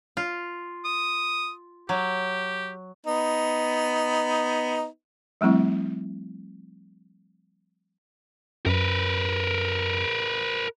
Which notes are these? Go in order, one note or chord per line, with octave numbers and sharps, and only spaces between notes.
F4
D#6
F#3 G4
B3 D#4
F3 G3 A3 C4 E4
F#2 A#4 B4